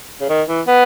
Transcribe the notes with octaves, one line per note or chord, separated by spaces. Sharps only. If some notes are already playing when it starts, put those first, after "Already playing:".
C#3
D#3
E3
B3